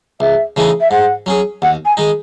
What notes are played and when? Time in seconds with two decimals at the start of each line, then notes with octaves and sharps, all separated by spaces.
0.20 C#2 E5
0.56 C#3 E3 A3 D#4
0.80 E5
0.91 G#2 F#5
1.26 F#3 C#4 G#4
1.62 D#2 F#5
1.85 G#5
1.97 D#3 G#3 D#4